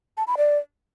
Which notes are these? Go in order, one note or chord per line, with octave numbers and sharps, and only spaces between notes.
A5
B5
D5